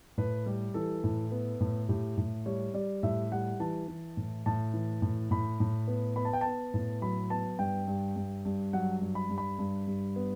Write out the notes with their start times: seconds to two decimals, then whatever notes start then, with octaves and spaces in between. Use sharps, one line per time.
0.18 A2 B4
0.46 G3 G4
0.74 E3 A4
1.04 A2
1.31 B3
1.60 A2
1.89 A2 G4
2.17 A2
2.46 G3 C#5
2.74 G3 D5
3.03 A2 E5
3.32 G3 F#5
3.60 E3 A5
3.88 E3
4.17 A2
4.46 A2 A5
4.74 E3
5.02 A2
5.31 A2 B5
5.60 A2
5.88 B3
6.16 B3 B5
6.25 A5
6.33 G5
6.41 B3 A5
6.74 A2
7.02 F#3 B5
7.30 B3 A5
7.59 G2 G5
7.87 G2
8.16 G2
8.45 G2
8.73 F#3 F#5
9.02 G2
9.15 B5
9.30 G2
9.38 B5
9.59 G2
9.87 G2
10.16 B3